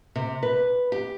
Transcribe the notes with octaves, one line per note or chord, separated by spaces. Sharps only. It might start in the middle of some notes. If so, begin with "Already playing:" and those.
C3
B4
G4